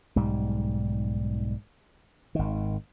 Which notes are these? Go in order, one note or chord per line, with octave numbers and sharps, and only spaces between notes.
B1 G#2 G3
G#1 D#3